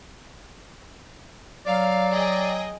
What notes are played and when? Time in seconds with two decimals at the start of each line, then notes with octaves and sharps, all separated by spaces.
1.66 F#3 D5 F5
2.11 G#4 D#5 G5